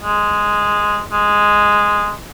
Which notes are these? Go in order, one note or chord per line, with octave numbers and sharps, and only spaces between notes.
G#3
G#3